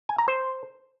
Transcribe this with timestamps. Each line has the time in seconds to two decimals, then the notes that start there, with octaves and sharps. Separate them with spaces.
0.09 G#5
0.18 A#5
0.28 C5